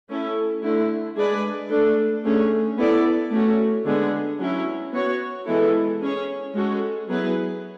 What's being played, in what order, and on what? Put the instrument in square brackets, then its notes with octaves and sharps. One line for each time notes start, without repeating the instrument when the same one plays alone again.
[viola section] A3 C#4 E4 A4
D3 A3 E4
G#3 D4 G#4 B4 D5
A3 D4 A4
D3 A3 C#4 G#4
B3 E4 A4 D5
A3 C#4 F#4
D3 G#3 B3 D4 G#4
F#3 C#4 E4
B3 F#4 C#5
E3 G#3 B3 E4 A4
C#4 G#4 C#5
G#3 C#4 F#4 A4
F#3 B3 E4 G#4 B4